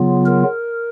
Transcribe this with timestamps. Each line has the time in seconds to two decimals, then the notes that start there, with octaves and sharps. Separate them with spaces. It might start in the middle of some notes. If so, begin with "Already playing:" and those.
Already playing: C#3 F#3 B3 F4
0.26 A#4